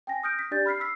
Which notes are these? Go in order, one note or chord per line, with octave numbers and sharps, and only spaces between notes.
G5 G#5 A#6
D#6 F6 G6 A#6 D7
B6
D4 G4 D5 G6 A6
B5 F6 B6 C7
B5 E6 B6 C7